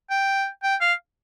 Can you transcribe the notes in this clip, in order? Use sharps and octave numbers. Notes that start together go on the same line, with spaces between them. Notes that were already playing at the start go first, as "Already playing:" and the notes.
G5
G5
F5